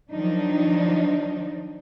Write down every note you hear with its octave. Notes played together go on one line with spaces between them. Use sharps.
D#3 F3 F#3 D4 D#4